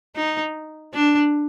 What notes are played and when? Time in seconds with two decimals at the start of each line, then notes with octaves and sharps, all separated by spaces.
0.16 D#4
0.94 D4